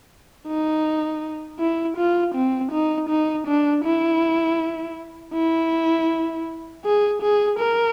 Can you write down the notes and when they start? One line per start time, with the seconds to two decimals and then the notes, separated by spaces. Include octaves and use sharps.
0.47 D#4
1.59 E4
1.97 F4
2.35 C4
2.72 D#4
3.09 D#4
3.47 D4
3.84 E4
5.34 E4
6.85 G#4
7.22 G#4
7.59 A#4